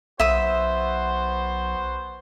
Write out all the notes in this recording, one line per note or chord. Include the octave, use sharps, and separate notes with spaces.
B1 B3 F#4 C5 E5 D#6